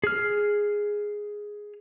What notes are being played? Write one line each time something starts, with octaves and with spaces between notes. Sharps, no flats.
G#4 F6